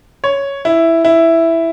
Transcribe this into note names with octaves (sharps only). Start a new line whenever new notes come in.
C#5
E4
E4